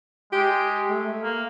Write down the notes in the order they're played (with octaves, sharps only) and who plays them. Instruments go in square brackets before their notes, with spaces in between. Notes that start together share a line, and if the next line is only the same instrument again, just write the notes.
[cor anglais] G#3 [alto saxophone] G4
[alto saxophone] A3
[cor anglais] A#3